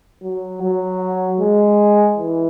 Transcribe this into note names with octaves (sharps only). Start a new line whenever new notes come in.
F#3
F#3
G#3
E3